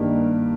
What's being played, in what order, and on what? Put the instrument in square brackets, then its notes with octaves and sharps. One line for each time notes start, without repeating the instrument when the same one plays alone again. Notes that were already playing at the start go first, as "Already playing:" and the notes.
Already playing: [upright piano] G2 D#3 A#3 D4 G4